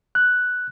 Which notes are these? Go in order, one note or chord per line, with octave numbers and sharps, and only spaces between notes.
F#6